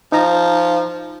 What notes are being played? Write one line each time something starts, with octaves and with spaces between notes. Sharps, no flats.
F3 D#4 A#5